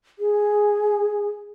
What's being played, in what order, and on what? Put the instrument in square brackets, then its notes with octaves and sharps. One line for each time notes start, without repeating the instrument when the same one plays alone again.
[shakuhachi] G#4